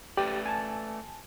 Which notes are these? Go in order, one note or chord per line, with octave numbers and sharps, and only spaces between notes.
A3 G4 B4 D5
G#5 A5